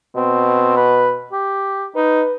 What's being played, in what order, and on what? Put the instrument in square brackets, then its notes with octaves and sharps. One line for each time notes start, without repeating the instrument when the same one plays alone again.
[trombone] B2 [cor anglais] C4
[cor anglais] B4
G4
[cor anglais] D#4 [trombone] B4